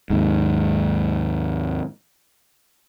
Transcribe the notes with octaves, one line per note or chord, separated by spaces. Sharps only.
D#2 G#2